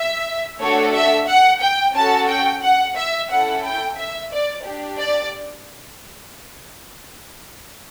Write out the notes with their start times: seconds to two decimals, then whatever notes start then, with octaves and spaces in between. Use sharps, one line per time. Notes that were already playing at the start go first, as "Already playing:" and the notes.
Already playing: E5
0.60 A3 D4 F#4 A4 C#5
0.94 E5
1.27 F#5
1.61 G5
1.94 C#4 F#4 A4 A5
2.28 G5
2.62 F#5
2.95 E5
3.29 C#4 E4 A4 F#5
3.63 G5
3.97 E5
4.31 D5
4.65 D4 G4
4.98 D5